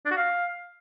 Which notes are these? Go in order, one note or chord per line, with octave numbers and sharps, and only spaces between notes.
D4
F#4
F5